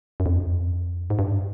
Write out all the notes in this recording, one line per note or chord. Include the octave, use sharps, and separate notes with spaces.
F#2
F2
G#2
G2